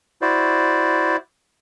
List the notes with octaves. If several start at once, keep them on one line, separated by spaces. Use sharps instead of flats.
E4 F#4 C5 D5